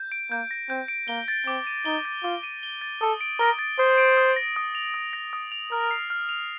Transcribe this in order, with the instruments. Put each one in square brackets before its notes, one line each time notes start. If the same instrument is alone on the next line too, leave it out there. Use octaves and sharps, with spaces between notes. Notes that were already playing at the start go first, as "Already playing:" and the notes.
Already playing: [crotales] G6
D7
[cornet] A#3 [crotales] G6
[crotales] A#6
[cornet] C4 [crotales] G6
[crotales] D7
[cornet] A#3 [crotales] G7
[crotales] A6
[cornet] C4 [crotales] D6
[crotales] D#7
[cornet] D#4 [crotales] G7
[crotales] A6
[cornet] F4 [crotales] D6
[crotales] D#7
G7
A6
[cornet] A4 [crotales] D#6
[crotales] D7
[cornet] A#4 [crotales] G7
[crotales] A6
[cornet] C5 [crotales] D#6
[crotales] D7
D#6
A#6
D#6
F7
D#6
A#6
D#6
F7
[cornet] A#4 [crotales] F6
[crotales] C7
F6
F7